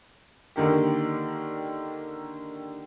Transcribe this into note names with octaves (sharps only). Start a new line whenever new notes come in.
D3 D#3 A#3 G4